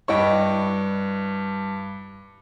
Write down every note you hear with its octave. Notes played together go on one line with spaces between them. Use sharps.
G2 E4 D#5 G5 C#6